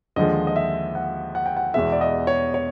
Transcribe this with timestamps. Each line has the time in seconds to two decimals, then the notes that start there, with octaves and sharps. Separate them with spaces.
0.16 D#2 D3 F3 G#3 D#5
0.47 D#5
0.56 E5
0.95 F#5
1.35 F#5
1.46 G5
1.57 F#5
1.74 E2 B2 G#3 E5
1.92 D5
2.01 D#5
2.27 C#5
2.54 C#5